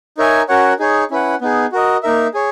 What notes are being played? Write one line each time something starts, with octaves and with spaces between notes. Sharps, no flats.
D#4 A#4 C#5 E5 G#5
C#4 F#4 A#4 C#5 F#5
D#4 G#4 C#5
C#4 E4 B4 F#5
B3 D#4 G#4
F#4 A#4 D#5
A#3 D#4 A#4 E5
G#4 C#5